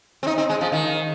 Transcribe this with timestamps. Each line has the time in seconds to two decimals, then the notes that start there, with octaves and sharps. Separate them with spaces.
0.23 C4
0.27 D#4
0.38 C4
0.49 G#3
0.61 F3
0.72 D#3